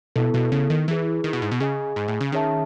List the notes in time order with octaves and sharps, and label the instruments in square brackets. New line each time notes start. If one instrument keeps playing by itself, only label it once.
[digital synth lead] B2 [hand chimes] B3 E4 A4
[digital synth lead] B2
C#3
D#3
[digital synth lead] E3 [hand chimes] E4 G#4 B4
[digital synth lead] D#3
B2
G#2
B2
[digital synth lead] C#3 [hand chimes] G#4 D#5 G#5
[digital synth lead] G#2
A2
C#3
[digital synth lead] D#3 [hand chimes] C#4 G#4 C#5 E5 A5